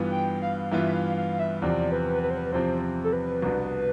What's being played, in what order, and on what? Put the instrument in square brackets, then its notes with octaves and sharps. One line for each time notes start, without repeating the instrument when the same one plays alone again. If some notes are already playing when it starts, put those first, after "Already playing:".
Already playing: [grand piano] G2 E3 B3 F4
[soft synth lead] G5
F5
[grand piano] G2 E3 B3 F4 [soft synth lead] E5
[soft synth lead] F5
F5
E5
[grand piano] E2 C3 F3 C4 [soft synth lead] D5
[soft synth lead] B4
B4
C5
B4
[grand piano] E2 C3 F3 C4 [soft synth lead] C5
[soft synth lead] A4
B4
[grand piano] C2 B2 B3 D4